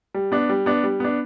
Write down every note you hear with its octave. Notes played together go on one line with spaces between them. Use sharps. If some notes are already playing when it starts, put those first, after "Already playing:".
G3
B3 D4
G3
B3 D4
G3
B3 D4